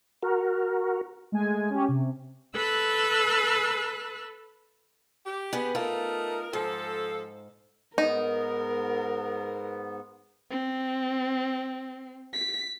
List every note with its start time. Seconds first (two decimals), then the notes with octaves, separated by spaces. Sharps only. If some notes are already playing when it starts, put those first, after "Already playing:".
0.23 F#4 A#4
1.32 G#3 A3 G#5
1.70 C#4 G4
1.88 C3
2.54 A4 B4 E6 F#6
5.26 G4
5.53 B3 G#4 B4
5.75 A3 D#4 F4 A#4
6.53 G#2 F3 A4
7.98 G#2 B3 D#4 A#4
10.51 C4
12.34 B6